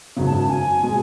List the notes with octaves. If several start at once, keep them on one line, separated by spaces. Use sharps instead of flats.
G#1 F#2 C#3
A5
A5
G#5
B2 G#3